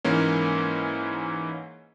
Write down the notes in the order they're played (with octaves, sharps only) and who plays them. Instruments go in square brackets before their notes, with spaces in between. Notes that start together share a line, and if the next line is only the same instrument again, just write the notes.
[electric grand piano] G#2 E3 A#3 C#4